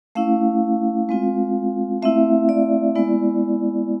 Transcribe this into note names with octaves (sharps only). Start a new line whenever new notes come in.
A3 C#4 E4 F5
G#3 C4 F4
A3 C4 E4 E5
D5
G#3 B3 E4